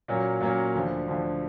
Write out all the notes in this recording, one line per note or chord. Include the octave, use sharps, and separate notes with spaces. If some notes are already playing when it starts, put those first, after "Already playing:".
A#2 F#3 A#3 C#4
A#2 F#3 A#3 C#4
D2 D3 F3
D2 D3 F3